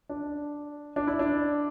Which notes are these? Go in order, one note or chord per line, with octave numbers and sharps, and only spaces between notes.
D4
D4
E4
D4